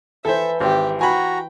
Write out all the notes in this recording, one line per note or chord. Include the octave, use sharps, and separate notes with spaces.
E3 A4 C5 E5
G#1 G4
F#4 G5 G#5 A#5 B5